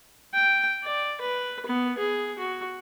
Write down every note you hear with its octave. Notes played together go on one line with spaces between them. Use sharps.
G5
D5
B4
B3
G#4
F#4